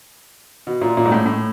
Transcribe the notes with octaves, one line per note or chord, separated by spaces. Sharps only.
B2
A#2
A#2
G#2
A2
A2